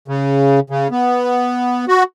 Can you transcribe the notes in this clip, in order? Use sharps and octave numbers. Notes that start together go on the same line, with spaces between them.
C#3
C#3
B3
F#4